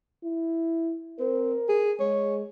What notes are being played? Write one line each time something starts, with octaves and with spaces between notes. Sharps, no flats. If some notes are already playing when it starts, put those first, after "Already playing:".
E4
C4 A#4
G#4
G#3 C#5